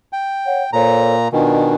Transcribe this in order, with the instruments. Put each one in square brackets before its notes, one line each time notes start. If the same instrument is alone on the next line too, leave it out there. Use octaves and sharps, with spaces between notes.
[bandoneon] G5
[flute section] C#5 F#5
[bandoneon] A#2 A#5 [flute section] A4 C5 C#5
[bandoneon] B2 D#3 [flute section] D4 F4 G#5